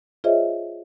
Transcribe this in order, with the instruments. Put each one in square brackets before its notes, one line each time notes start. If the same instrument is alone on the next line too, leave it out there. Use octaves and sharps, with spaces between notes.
[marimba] F4 G#4 C5 C#5 D#5 E5